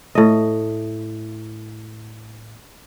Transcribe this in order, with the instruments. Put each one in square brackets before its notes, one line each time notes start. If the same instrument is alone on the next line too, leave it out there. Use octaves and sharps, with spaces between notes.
[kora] A2 D#5